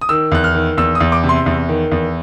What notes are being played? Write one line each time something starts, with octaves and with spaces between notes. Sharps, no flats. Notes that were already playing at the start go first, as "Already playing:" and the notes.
D#6
D#3 E6
E2 F#6
F6
D#3
E2 E6
D#6
E2
D6
C3
C6
E2
D#3
E2